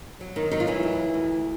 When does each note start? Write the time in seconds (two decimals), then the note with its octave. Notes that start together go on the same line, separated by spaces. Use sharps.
0.21 F#3
0.36 D#3 D#4
0.51 D#3 F#3 D#4
0.60 F4
0.67 E3 E4
0.83 D2
1.14 D2